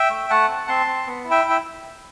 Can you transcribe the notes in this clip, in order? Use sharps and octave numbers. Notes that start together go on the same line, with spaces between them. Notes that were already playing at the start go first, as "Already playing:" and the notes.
Already playing: E5 G5
A3
A3 F#5 A5
C4
C4 A5 C6
C4
B3
E4
E5 G5
E4
E5